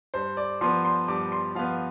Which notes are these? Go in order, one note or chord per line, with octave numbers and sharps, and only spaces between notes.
G2 C5
D5
F3 B3 C6
C6
G2 D6
C6
F3 B3 F5